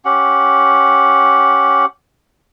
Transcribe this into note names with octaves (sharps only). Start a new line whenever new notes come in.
C#4 G4 F#5